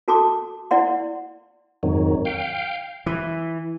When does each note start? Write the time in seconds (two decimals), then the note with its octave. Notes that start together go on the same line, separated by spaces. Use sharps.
0.08 F#4 A4 A5 C6 D6
0.71 E4 D5 F#5 C6
1.83 F2 G#2 D#3 F#3
2.25 F5 G5
3.06 E3